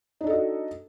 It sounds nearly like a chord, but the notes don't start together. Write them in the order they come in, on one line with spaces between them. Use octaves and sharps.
D#4 D4 A4 D#5 F#4